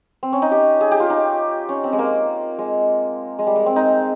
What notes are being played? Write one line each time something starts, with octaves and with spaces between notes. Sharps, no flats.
C4
C#4
D#4
G4
G#4
G4
F4
D#4
C#4
C4
G#3
A#3
G#3
G#3
G3
G#3
C4
D#4